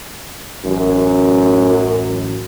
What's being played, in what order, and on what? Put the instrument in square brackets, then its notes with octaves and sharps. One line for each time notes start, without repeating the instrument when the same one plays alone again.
[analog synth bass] A1 [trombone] F#2